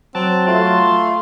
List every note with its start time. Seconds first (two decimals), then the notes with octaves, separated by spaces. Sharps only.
0.15 F#3 C4 A5
0.47 A3 F4 C6